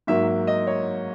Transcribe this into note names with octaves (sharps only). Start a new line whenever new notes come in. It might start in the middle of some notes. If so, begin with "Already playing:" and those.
G#2 F#3 A#3 E5
E5
D#5
C#5